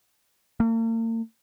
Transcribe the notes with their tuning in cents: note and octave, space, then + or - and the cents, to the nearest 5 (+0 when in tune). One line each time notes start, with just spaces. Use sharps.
A#3 -45